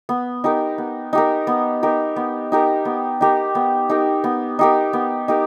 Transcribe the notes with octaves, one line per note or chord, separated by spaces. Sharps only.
B3
D#4 G4 A#4
B3
D#4 G4 A#4
B3
D#4 G4 A#4
B3
D#4 G4 A#4
B3
D#4 G4 A#4
B3
D#4 G4 A#4
B3
D#4 G4 A#4
B3
D#4 G4 A#4